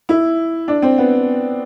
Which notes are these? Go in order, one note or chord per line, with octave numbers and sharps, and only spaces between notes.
E4
D4
C4
B3